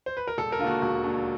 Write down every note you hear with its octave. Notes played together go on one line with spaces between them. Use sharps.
C5
B4
A#4
E1 A4
A#4
D#2 D3 F4 F#4
E1 F#4
D#2 D3